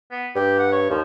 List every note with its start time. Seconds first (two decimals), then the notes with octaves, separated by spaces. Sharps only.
0.12 B3
0.36 G2 G4
0.59 F#5
0.72 C#5
0.90 D#2 F3